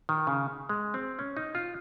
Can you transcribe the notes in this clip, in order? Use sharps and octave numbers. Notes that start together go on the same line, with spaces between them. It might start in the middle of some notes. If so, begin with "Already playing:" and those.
D#3
C#3
G#3
C4
C#4
D#4
F4